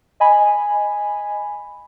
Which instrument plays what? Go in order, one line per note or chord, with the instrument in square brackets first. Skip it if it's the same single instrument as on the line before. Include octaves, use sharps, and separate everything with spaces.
[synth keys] D#5 G#5 B5